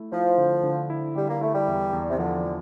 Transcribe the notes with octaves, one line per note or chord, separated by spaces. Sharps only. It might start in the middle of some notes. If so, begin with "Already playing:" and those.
Already playing: A3 E4
F3 E4
D3
D3
E4
D3 G3
A#3
A3 E4
G3
E2
E2
C3
D3 F3
F3